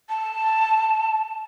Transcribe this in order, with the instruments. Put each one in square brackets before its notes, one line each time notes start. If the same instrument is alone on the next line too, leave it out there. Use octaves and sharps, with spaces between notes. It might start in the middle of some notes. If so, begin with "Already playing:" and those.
[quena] A5